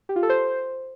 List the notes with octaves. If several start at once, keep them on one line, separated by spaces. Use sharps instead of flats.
G4
F4
A4
C5